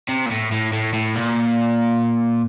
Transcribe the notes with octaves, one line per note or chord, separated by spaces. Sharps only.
C3
A#2
A2
A2
A2
A2
A#2